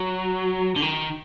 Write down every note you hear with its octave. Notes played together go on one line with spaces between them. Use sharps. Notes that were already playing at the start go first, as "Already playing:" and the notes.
Already playing: F#3
D3
D#3